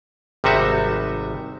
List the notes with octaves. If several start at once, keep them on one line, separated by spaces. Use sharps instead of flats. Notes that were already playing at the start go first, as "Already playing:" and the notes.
G#1 C3 G3 D#4 F#4 E5